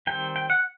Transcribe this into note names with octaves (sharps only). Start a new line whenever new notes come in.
D#3 G3 C4 G5
G5
F#5